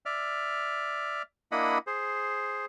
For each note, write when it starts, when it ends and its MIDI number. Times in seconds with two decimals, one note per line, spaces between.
0.06 1.22 74
0.06 1.22 76
0.06 1.22 89
1.52 1.78 58
1.52 1.78 62
1.52 1.78 64
1.52 1.78 75
1.52 1.78 78
1.52 1.78 83
1.87 2.66 68
1.87 2.66 72